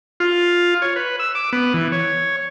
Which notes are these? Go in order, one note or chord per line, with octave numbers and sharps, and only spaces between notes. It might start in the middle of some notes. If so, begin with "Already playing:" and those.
F4
C#5
B4
E6
D6
B3
E3
C#5